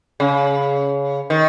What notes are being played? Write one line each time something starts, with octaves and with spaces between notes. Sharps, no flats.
C#3
D#3